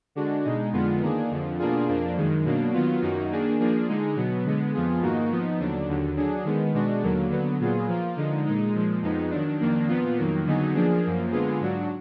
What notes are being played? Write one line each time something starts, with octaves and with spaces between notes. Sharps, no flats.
D3 G#3 D4 F#4
B2 G#3 D#4
F2 D3 G#3 B3 F4
D#3 A#3 D4 G#4
F2 D3 F3
B2 A#3 D4 F4 G#4
F2 F3 A#3 D4
F#2 D#3 G#3
B2 F#3 A#3 D4
D#3 F#3 B3 F4
F#2 D#3 A#3 D#4 F#4
D#3 A#3 D4 G#4
F3 A#3 D4 G#4
D3 G#3 D#4 G#4
B2 F#3 B3
D3 G#3 B3
F2 F3 B3 F4 G#4
G#2 D#3 A#3 D#4 F#4
F3 B3 D#4
D#2 D3 F#3 D4
D#2 D3 F#3
D3 F#3 D4 G#4
D#3 G#3 B3
B2 G#3 D4 F#4
D#2 D3 F#3 A#3
D3 F#3 B3
A#2 F#3 B3 F4 G#4
F3 A#3 F4
D3 F3 G#3 D#4
A#2 G#3 D#4
A#2 F3 G#3
F2 F3 G#3 B3 D#4
D#3 F#3 D4
F2 D#3 A#3 D4
A#2 F3 B3 F4
F2 D#3 F#3 A#3
D3 F#3 B3 D#4 G#4
F3 A#3 D4 G#4
F#2 F3 A#3
D3 G#3 B3 F4 G#4
G#2 F#3 D4 F#4